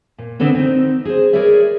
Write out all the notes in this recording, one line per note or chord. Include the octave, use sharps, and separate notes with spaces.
A#2
D3 B3 C4 D4 A4 B4
C4 D#4
G#4 C5
G#4 A#4 B4 C#5 D5 E5